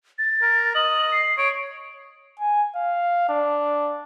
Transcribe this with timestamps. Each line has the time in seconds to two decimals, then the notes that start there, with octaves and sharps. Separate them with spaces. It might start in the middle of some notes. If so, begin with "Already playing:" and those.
0.19 A6
0.42 A#4
0.75 D#5 F#7
1.12 C7
1.38 C#5 D7
2.40 G#5
2.76 F5
3.29 D4